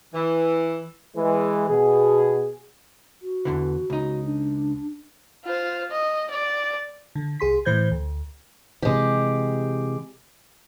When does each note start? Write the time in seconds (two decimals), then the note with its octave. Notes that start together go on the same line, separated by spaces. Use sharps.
0.14 E3
1.15 E3 G#3
1.67 B2 G#4
3.22 F#4
3.45 E2 D3 E3
3.90 C#2 D#4
4.25 D4
5.44 F4 C5
5.91 D#5
6.31 D5
7.15 D3
7.40 C2 G#4 C6 B6
7.65 A2 E3 C5 G6 G#6
7.91 D2
8.82 C3 E3 G#3 G4